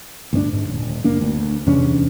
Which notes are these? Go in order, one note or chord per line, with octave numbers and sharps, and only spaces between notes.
D2 G2 A#3 D4
G#2
D#1
F#1 A#3 D4
D2
E2 C3 C#4 D4